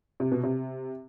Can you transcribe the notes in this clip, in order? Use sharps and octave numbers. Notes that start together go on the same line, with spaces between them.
C3
B2
C3